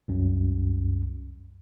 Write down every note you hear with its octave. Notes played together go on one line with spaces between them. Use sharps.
C2 F#2